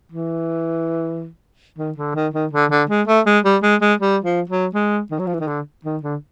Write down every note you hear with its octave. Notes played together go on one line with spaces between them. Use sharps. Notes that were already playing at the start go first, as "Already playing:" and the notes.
E3
D#3
D3
D#3
D#3
D3
D3
G#3
A3
G#3
G3
G#3
G#3
G3
F3
F#3
G#3
D#3
F#3
F3
E3
D#3
D3
D#3
D3